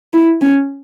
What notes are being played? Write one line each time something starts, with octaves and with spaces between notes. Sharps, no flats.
E4
C#4